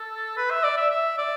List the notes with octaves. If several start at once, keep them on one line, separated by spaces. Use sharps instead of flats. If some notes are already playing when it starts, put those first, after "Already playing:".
Already playing: A4
B4
E5
D5
E5
E5
D5